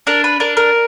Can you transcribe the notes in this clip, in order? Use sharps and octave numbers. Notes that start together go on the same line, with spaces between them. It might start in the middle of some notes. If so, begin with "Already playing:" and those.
D4 A#4
B4
D4 A#4
A#4